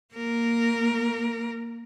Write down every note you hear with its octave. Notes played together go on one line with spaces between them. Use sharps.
A#3 A#4